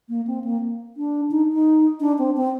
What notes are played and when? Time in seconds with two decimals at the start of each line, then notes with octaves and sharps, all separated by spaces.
0.09 A#3
0.27 C4
0.44 A#3
0.97 D4
1.31 D#4
1.53 D#4
2.01 D4
2.18 C4
2.37 C4